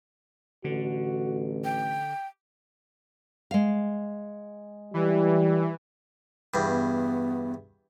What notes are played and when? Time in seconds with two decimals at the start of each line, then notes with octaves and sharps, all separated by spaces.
0.64 A1 D3 F#4
1.64 G5
3.51 G#3 F5
4.94 E3 G3
6.54 E2 G2
6.67 B3